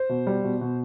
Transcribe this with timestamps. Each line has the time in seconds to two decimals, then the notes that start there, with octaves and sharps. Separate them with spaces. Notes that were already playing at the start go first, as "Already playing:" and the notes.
Already playing: C5
0.09 B2
0.27 G3
0.44 B2
0.61 B2